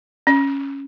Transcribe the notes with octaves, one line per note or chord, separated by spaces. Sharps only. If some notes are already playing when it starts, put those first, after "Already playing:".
C#4